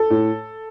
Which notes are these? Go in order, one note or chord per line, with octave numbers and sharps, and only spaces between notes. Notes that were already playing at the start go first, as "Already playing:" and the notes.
Already playing: A4
A2